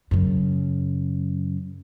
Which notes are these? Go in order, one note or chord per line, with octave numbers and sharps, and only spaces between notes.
F#2 C#3